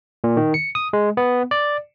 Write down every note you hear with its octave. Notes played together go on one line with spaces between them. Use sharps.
A#2
D#3
C#7
D#6
G#3
B3
D5